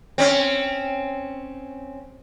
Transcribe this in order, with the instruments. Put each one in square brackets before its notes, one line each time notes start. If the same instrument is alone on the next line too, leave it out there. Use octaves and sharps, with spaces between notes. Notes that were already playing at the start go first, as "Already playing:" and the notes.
[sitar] C4 C#4